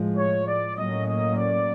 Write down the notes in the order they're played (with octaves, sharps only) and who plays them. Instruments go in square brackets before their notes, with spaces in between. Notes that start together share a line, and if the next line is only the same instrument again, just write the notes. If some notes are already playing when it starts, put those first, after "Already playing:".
Already playing: [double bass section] A2 F3 G#3
[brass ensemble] C#5
D5
[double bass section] A2 F#3 A#3 C#4 [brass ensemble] D#5
[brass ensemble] D#5
D5